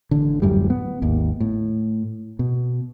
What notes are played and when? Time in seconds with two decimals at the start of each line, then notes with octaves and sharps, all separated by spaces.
0.11 A1 D3
0.42 D1 F#2 A2 G3
0.70 B3
1.02 G#1 D#2
1.40 A2
2.39 B2